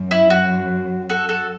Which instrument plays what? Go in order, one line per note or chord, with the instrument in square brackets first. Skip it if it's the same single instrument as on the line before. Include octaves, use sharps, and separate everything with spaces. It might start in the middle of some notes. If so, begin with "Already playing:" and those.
Already playing: [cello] F#2
[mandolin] E4
F#4
F#4 A4
F#4 A4